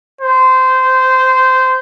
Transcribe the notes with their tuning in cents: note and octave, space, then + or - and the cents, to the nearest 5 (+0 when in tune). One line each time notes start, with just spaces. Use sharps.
C5 -15